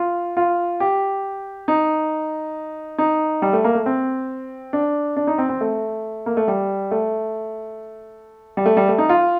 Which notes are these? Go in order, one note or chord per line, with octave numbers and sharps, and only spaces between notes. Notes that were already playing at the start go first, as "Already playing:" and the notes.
Already playing: F4
F4
G4
D#4
D#4
G3
A3
A#3
A3
C4
D4
D4
D#4
C4
C4
A3
A#3
A3
G3
A3
G3
A3
G3
A3
D#4
F4